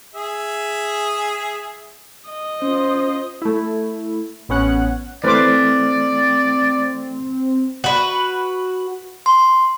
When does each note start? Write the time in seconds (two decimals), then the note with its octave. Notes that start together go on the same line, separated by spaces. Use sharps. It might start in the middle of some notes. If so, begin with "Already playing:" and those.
0.15 G#4 E5
2.30 D#5
2.62 C#4 F4 C5
3.42 A3 E4
4.49 A1 B3 C#4 F#5 F#6
5.24 E3 A3 C4 B4 C5 D5 D6 F6
7.84 F#4 B4
9.26 C6